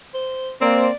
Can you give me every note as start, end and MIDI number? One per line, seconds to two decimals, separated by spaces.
0.14 0.51 72
0.62 0.88 58
0.62 0.88 60
0.62 0.95 74